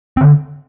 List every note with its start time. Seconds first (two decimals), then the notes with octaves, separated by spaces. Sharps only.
0.17 C4
0.21 D3